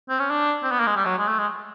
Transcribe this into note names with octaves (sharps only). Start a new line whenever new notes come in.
C4
C#4
D4
C4
B3
A#3
G#3
G3
F#3
G#3
A3
G#3